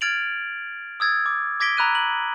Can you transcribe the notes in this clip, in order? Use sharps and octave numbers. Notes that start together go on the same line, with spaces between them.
F6 G#6 A6 D7 F7 F#7
D#6 E6 G#6 A6
D6
D6 G#6 A#6 B6 D7 G7
A#5 B5 E6 F#6 G#6 D#7
F#7